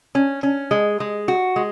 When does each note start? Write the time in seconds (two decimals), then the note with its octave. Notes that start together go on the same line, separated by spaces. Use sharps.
0.15 C#4
0.43 C#4
0.71 G#3
1.00 G#3
1.28 F#4
1.56 G#3